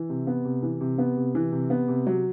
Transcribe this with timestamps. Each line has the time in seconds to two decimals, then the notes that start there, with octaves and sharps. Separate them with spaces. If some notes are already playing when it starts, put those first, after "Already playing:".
Already playing: E3
0.09 C3
0.27 B3
0.45 C3
0.62 E3
0.81 C3
0.98 B3
1.17 C3
1.35 E3
1.52 C3
1.70 B3
1.88 C3
2.07 F#3